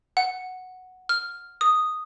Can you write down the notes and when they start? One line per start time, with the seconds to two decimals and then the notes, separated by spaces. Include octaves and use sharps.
0.17 F#5
1.09 F6
1.61 D#6